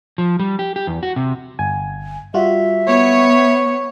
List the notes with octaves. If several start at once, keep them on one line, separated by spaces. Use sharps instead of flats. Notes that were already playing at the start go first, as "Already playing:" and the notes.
F3
G3
G4
G4
E2
F#4
C3
G1 G#5
G3 F4 F#4 E5
B3 C#5